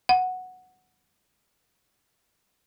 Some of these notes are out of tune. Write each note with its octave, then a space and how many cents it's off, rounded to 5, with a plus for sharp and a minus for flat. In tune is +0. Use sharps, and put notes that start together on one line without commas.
F#5 -5